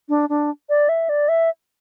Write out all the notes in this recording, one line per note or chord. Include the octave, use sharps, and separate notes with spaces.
D4
D4
D5
E5
D5
E5